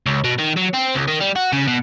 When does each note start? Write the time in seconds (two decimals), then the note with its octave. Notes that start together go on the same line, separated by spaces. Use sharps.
0.06 C#2
0.24 B2
0.39 D#3
0.57 F#3
0.74 C4
0.95 C#2
1.08 D#3
1.21 G3
1.36 F#4
1.53 C#3
1.67 B2